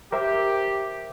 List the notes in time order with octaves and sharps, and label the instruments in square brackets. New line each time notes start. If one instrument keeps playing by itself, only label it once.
[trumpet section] G4 [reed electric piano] A#4 C5 E5